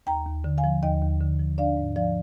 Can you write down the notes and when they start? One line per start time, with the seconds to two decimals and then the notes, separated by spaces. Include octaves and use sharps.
0.07 D#2 G5 A#5
0.27 D#2
0.44 D3
0.58 F5 G#5
0.64 F3
0.83 D#2 D#5 G5
1.02 D#2
1.20 D3
1.39 F3
1.58 D4 D5 F5
1.77 G#2
1.96 F3 D5 F5